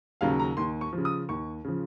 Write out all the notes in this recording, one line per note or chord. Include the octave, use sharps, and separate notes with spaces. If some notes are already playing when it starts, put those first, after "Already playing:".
D#2 C#3 F#3 F5
A#5
D#2 C6
C#6
C#3 F3
D#6
D#2 C#6
C#3 F3